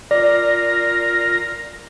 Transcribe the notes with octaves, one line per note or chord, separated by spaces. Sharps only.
F4 A#4 D5 A#5